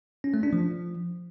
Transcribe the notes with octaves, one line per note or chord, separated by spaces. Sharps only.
C#4
A3
D4
F3